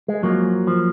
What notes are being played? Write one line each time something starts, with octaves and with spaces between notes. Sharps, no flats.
G#3
F#2 F3 F#3 A#3
F3